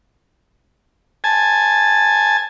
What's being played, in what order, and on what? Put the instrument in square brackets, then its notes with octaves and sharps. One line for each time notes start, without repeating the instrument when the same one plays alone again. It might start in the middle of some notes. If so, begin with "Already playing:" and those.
[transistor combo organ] G#5 A5